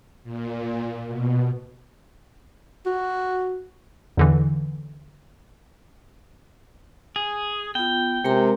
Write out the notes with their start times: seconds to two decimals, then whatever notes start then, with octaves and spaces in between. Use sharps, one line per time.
0.24 A#2
1.08 B2
2.86 F#4
4.17 E2 D3 E3
7.16 G#4
7.75 B3 F4 G5
8.25 C3 G#3 A#4 A#5